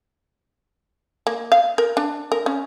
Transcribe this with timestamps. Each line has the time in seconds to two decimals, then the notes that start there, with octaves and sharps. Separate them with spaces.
1.27 A#3
1.52 F5
1.78 A#4
1.97 D4
2.32 A#4
2.46 C#4